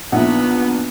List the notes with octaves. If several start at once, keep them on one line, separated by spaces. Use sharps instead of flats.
A#1 B3 D#4 B4 E5 F#5